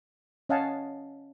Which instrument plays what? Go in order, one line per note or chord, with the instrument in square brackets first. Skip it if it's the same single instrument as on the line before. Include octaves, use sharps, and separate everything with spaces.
[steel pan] C#4 D#5 F5 F#5 G#5 A5